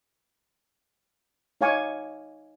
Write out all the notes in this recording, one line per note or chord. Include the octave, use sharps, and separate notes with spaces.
D#4 C#5 F5 G#5 C#6 D6